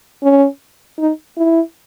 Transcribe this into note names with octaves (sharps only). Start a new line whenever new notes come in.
C#4
D#4
E4